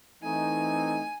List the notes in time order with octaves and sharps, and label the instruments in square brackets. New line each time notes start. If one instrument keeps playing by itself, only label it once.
[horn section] E3 A3 C4 D#4 [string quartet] G#5